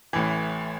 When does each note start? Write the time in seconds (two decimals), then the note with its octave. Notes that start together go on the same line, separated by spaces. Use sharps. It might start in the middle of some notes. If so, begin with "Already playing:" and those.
0.13 A1 A2 E3